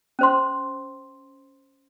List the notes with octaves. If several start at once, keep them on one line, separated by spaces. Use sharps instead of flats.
C#4 C5 C6